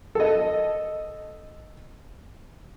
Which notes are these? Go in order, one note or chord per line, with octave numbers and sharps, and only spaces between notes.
A4 D#5